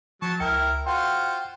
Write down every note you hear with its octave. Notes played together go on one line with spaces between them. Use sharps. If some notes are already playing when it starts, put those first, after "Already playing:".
F3 F#3 A5 C#6
C#2 E4 A#4 G5 C#7
F4 F#4 C5 G5 C6